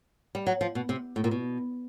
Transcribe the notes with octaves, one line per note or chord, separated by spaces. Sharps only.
G3
F#3
F3
B2
C3
A2
A#2
B2